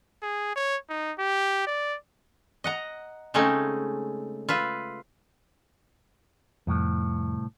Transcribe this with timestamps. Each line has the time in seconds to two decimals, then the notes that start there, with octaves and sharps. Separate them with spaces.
0.22 G#4
0.55 C#5
0.90 D#4
1.19 G4
1.67 D5
2.64 D#5 F#5 A#5
3.34 C#3 G#3 A3 C4 C#4 D#4
4.49 F4 B4 E5
6.67 C2 F2 A2